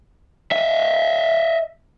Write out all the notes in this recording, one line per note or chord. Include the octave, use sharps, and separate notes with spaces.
D#5 E5